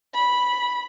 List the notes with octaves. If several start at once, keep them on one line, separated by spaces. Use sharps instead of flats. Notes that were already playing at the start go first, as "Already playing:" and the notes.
B5